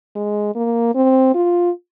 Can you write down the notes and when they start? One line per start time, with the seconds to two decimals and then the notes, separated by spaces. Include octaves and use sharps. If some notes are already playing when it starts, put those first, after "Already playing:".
0.16 G#3
0.55 A#3
0.95 C4
1.35 F4